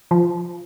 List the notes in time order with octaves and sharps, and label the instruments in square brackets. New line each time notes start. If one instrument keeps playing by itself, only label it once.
[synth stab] F3